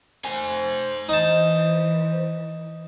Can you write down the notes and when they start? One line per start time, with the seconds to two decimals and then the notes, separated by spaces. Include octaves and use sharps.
0.24 C5 G#5
1.09 E3 D#4 A5